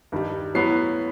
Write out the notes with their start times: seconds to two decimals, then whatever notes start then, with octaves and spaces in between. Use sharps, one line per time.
0.12 G2 D#3 G3
0.55 A2 F#3 B3 C7